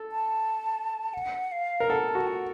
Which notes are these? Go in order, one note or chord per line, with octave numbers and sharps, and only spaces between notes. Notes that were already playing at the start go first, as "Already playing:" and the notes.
Already playing: A4
A5
F#5
F5
A#4
A4 F#5
A5
F#4
F#5